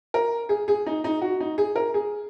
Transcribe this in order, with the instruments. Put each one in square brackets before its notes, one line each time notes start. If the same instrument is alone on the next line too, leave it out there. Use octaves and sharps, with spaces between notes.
[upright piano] A#4
G#4
G#4
D#4
D#4
F#4
D#4
G#4
A#4
G#4